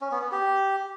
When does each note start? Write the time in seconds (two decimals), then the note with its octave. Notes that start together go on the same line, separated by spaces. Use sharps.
0.01 C#4
0.11 B3
0.22 B3
0.32 G4